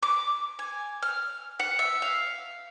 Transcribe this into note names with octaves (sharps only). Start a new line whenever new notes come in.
D6
G#5
F6
F#5
E5
F5